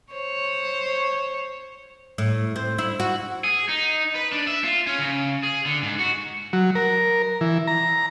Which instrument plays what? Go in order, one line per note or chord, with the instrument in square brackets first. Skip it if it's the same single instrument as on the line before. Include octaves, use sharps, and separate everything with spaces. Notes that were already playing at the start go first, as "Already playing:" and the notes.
[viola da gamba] C5 C#5
[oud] A2
C4
E4
F#4
[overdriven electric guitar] G#4
D#4
B4
D4
E5
F4
C#4
C#3
G#4
D3
G#2
F#4
[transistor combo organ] F#3
A#4
E3
A#5